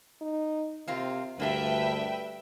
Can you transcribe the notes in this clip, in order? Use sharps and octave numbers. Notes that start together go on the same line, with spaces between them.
D#4
C3 A#3 C4 F4
D2 G2 A#3 D4 G4 B4 E5 G5